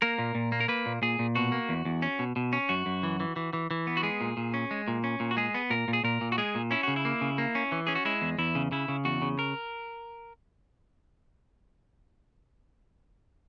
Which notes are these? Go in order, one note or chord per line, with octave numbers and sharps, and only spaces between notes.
A#3 A#4
A#2
A#2
A#3
A#4
A#3 B4
A#2
A#2 G#4
A#2
B2 F#4
A#3
E2
E2
C#4
B2
B2
C#4
F#2 F#4
F#2
E3
E3
E3
E3
E3
B3
F#4
G#3 G#4
A#2
A#2
C#4
G#3
A#2
C#4
A#2
F#4
G#3 G#4
B3
A#2 A#4
A#2
G#4
A#2 A#4
A#2
F#4
G#3 G#4
A#2
C#4 E4
C#3 F#4
E4
A#3
C#3
A#3
C#4
E3
C#4 G#4
F#4
G#3 E4
E2
E2 E4
C#3
C#3 E4
C#3
E2 F#4
C#3
A#4